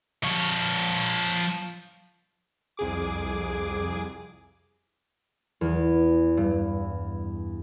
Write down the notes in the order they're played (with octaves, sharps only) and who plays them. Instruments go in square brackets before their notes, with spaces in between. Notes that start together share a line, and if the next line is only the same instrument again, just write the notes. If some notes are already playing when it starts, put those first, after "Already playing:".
[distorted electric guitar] F3 C#5
[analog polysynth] C2 F2 G#4 D6
[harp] E2
G2